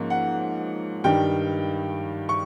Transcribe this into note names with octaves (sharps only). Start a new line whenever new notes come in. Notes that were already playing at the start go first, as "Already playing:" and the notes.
Already playing: G#2 F3 A#3 C#4
F#5
G2 D#3 G3 G5
C#6